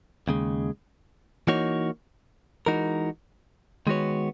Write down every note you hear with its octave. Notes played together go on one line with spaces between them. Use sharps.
D#2 C#3 G#3
E3 A#3 D#4 F#4 C#5
E3 G#3 D#4 F#4 A#4
D#3 G#3 B3 F#4 C#5